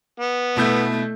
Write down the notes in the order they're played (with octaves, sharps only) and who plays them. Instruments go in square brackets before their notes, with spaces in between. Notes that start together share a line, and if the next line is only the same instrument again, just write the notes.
[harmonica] B3
[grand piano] B2 E4 G6 [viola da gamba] A3